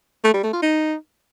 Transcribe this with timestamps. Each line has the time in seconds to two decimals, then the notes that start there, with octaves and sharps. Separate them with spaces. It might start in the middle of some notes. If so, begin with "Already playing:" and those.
0.24 A3
0.34 G3
0.43 A3
0.53 F4
0.63 D#4